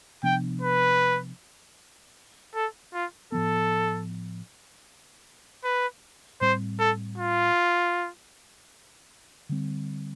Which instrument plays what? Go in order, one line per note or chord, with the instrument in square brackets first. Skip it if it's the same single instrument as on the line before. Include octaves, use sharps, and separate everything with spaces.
[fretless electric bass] C3 F3 B3 D4 [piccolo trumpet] G5
[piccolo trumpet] B4
A4
F4
[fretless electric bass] A2 F3 B3 [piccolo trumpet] A4
[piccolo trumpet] B4
[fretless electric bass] A2 G3 C4 [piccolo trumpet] C5
[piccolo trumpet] A4
F4
[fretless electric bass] D3 G3 C4